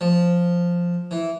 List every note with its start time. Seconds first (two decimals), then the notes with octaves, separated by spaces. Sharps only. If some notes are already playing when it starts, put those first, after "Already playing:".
0.01 F3
1.11 E3